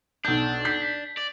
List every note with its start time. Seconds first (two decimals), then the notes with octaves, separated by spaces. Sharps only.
0.25 B1 D4 G6
0.65 G6 B6
1.17 D5